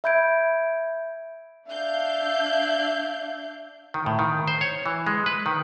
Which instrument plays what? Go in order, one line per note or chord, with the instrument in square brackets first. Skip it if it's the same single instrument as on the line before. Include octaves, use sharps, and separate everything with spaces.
[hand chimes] E5 B5 G6 G#6 D7
[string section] D4 F5 G6 [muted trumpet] E5
[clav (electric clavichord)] D#3
A2
D#3
C5
C#5
E3
G#3
B4
D#3